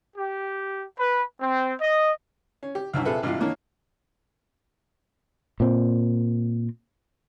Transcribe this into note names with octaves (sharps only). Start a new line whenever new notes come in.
G4
B4
C4
D#5
C#4
G4
C2 F#2 D4
C3 F4 G#4 A4 B4 E5
G#1 G2 C3 E3 F4
D#3 E3 A#3 D4 C#5
A#2 C4